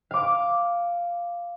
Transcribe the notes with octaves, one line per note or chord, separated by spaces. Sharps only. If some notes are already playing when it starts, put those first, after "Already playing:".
F5 D6